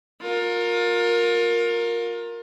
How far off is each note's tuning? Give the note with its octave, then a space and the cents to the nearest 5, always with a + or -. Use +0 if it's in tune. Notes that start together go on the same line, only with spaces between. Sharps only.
F4 +30 A#4 +0